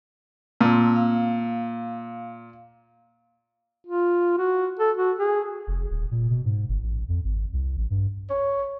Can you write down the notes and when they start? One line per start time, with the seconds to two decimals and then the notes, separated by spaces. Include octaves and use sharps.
0.61 A#2 C4 A5 E6
0.96 F5
3.86 F4
4.38 F#4
4.79 A4
4.97 F#4
5.19 G#4
5.67 F1
5.90 D#1
6.11 A#2
6.30 B2
6.45 G#2
6.69 G1
6.82 A1
7.09 F2
7.24 G#1
7.53 C2
7.77 A1
7.90 G2
8.30 C#5